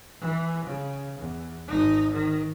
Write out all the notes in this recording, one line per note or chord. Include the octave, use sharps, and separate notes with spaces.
E3
C#3
E2
G#1 D#4
D#3